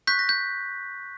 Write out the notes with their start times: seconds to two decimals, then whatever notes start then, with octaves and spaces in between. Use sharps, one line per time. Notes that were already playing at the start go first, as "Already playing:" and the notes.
0.07 C#6 F#6 G6 B6
0.19 A#6
0.29 G6